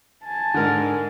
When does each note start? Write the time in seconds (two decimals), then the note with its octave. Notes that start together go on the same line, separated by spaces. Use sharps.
0.24 G#5 A5
0.54 G#2 D3 G#3 A#4